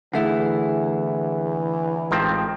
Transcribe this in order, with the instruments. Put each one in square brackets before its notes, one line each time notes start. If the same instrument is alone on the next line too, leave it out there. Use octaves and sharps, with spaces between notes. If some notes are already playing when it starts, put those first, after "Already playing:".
[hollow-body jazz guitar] D3 A3 E4 [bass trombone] E3 [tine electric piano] G#4 E5 F#5
[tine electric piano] A1 G#3 [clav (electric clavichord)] D#3 F3 C4